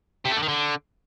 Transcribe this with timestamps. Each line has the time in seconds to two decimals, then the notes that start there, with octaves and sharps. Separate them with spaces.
0.25 C3
0.31 A3
0.37 D3
0.43 D#3
0.49 D3